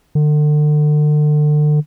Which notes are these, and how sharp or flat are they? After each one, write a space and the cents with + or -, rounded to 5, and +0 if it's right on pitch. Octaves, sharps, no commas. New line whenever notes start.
D3 +35